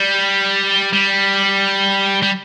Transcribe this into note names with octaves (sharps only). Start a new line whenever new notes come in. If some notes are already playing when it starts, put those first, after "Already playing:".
Already playing: G3
G3
G3